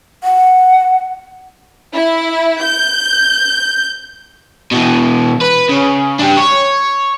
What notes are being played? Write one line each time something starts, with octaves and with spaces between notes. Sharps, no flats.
F#5
E4
G6
B2 E3
B4
C#3
D4 G4
C#5